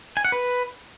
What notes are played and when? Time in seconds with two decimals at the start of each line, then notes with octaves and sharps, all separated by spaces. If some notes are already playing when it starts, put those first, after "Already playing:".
0.17 G#5
0.25 F#5
0.32 B4